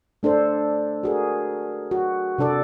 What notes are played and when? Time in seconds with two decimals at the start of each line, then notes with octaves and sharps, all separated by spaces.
0.23 A3 D4 A4 C5
1.03 F#4 G#4 A#4
1.91 F#4
2.38 C3 D4 A4 D5